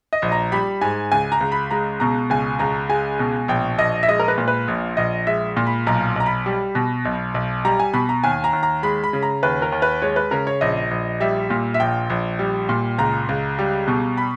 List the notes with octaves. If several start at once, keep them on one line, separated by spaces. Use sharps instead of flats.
D#5
A#1
A#5
G3 B5
G#2 G#5
C#2 G#5
A#5
C#2
B5
G#3 A#5
B2 A#5
C#2 G#5
C#2 A#5
G#3 G#5
B2
A#1 G5
A#1 D#5
E5
G#3 D#5
A#4
B4
A#2
B4
A#1
A#1 D#5
G#3 E5
A#2
B5
B1 A#5
B1 A#5
B5
G3
B2
B1
B1
G3 A#5
G#5
B2 B5
A#5
D#2 G#5
A#5
D#2
A#5
G#3 B5
B5
C#3
A#5
D#2 B4
A#4
D#2
B4
G#3 C#5
B4
C#3 A#4
C#5
A#1 D#5
A#1
G3 E5
A#2
E5
A#1 G5
A#1
G3
A#2
C#2 A#5
C#2
G3
B2
B5